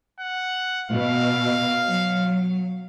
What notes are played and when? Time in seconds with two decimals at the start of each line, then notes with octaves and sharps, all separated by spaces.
0.20 F#5
0.90 B2 F5
1.88 F#3